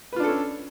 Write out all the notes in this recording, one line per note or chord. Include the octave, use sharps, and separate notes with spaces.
C#4 D4 F4 A4 B4